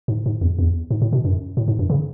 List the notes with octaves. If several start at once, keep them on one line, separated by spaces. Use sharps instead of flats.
G#2
G#2
E2
E2
G#2
A2
B2
F#2
A2
G#2
F#2
C#3